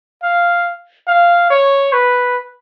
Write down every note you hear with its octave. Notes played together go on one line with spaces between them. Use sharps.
F5
F5
C#5
B4